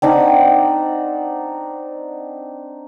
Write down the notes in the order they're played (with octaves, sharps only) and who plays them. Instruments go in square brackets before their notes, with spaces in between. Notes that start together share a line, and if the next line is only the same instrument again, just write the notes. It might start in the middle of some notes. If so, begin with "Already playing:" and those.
[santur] C4 D4 D#4 F#5